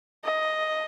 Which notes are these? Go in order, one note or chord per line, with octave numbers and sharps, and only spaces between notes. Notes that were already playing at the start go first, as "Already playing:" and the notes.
D#5